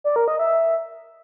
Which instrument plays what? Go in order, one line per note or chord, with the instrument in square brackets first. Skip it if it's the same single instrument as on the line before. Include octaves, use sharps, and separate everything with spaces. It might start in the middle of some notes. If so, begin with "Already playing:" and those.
[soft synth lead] D5
A#4
D#5
E5